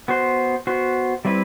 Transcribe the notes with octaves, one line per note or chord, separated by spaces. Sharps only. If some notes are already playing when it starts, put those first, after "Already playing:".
B3 F#4 C5
B3 F#4 C5
G3 C4 E4 B4